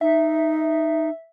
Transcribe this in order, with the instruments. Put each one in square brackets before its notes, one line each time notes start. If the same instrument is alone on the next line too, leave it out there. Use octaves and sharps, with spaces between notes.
[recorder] D#4 [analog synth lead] E5